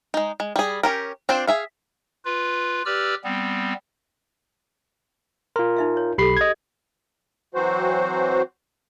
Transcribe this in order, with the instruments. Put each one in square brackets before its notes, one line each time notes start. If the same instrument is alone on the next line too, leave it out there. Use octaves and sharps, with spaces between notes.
[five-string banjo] G#3 D#4
G#3
G3 G#4
C#4 G4 A#4
C4 D4 F4 C5
G#4 E5 F5
[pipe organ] F4 B4
G4 B4 D5 E6 F6
G3 B3 C4
[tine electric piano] F4 A#4 [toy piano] C6
[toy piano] D#4 E5 F5
C#5
[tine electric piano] B1 B5 C7 [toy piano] G4 A4
[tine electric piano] D#5 G#6
[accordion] E3 F#3 C4 F#4 C5